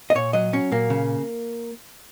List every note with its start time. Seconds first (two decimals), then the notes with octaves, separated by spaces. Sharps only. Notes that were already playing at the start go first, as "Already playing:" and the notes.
0.10 D#5
0.15 A#2 C#5
0.33 F#3 D#5
0.53 F#3 C#4
0.72 A#2 A#3
0.90 C#3